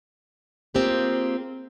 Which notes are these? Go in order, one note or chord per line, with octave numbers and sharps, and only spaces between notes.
A#3 C4 F4 G4 G#4